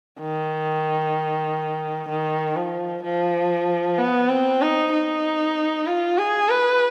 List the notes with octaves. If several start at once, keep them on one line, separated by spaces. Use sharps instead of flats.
D#3
D#3
F3
F3
B3
C4
D#4
D#4
F4
G#4
B4